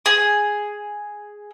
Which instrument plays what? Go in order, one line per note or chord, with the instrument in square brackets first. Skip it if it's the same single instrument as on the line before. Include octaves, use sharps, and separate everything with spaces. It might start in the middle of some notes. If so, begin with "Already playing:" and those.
[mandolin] G#4